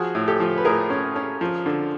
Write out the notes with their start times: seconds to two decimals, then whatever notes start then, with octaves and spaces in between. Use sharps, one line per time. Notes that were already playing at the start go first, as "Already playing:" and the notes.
Already playing: F3 F#4 G#4
0.15 A2
0.28 G4 A4
0.40 F3
0.58 B4
0.65 A2 G#4 A#4
0.90 C#4
1.16 C#4
1.41 F3
1.66 D3